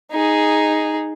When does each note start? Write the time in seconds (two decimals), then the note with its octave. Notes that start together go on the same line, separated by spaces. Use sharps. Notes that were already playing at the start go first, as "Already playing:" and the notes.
0.12 D#4 G#4